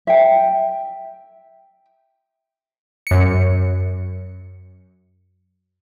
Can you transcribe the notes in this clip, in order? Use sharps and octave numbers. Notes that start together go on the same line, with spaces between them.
E5 G5
F#2 C#7